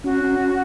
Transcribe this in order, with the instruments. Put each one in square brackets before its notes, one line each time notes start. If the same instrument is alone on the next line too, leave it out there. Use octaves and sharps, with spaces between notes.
[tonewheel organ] C#4 [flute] F#4